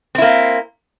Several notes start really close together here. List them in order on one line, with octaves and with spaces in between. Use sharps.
C4 E4 A#3